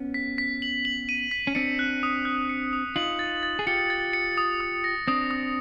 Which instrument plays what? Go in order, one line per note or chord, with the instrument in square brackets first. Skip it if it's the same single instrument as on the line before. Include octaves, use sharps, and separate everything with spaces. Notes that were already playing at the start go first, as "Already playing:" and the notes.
Already playing: [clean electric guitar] B3 C#4
[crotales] B6
B6
F#7
F#7
D#7
B6
[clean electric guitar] C#4
[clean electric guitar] C4 D4 [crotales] C#7
[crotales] F#6
D#6
F#6
C#7
D#6
[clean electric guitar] D#4 F4 [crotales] F#7
[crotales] A6
A6
[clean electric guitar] G#4
[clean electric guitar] F4 G4 [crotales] C#7
[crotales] A6
C#7
D#6
D#6
A#6
[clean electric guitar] C4 D4 [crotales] D#6
[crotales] D#6